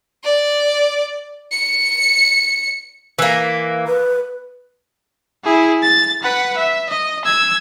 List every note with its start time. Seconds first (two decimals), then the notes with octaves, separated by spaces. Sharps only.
0.24 D5
1.52 C#7
3.19 E3 A#3
3.87 B4
5.45 E4 G#4
5.83 A6
6.23 B4 F#5
6.57 E5
6.90 D#5
7.25 E6 G#6